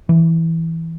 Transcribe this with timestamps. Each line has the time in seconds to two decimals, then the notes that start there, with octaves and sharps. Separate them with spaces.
0.09 E3